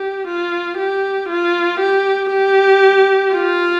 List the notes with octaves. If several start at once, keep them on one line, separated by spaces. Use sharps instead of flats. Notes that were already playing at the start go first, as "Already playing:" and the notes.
Already playing: G4
F4
G4
F4
G4
G4
F4